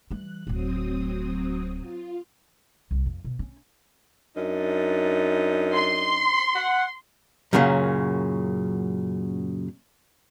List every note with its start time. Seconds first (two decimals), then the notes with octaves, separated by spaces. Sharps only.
0.11 E3 G3 F#6
0.47 D1 A2 F#3 C4 D#6
1.82 F4
2.91 C2
3.06 F2
3.25 B2
3.39 C#4
4.36 F#2 D4 D#4
5.74 C6
6.55 F#5
7.53 F#2 A#2 C#3 F3 F#3